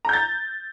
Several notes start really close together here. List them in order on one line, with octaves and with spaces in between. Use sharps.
A#5 G6 A6